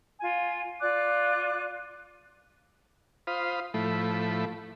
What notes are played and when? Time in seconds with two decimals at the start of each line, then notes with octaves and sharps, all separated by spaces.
0.20 F4 G#5
0.80 F4 D5 D6 F#6
3.27 F4 C5 F5 B5 D#6
3.74 A2 F3 A3 E4 B5